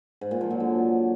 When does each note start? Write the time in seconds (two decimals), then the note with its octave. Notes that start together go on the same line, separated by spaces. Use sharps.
0.21 G#2
0.31 A#2
0.41 F3
0.51 F#3
0.60 D3